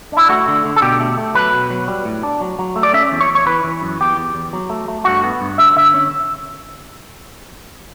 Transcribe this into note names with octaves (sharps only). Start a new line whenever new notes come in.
D4 E4
A3 F#4
D3
D3
A4
B2 G4
A3
A3
F#3 B4
B2
F#3
G3
A2
D4
F#3
F#3
A3
D5
C#4 E5
E2
C#5
E2
C#5
E3 B4
E3
F#2
E2 G4
E2
E2
F#3
A3
A3
G2 F#4
B3
G2
D3 E5
D3 E5
C#4